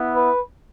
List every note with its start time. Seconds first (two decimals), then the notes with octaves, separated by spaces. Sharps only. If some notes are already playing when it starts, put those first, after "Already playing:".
Already playing: B3 E4
0.15 B4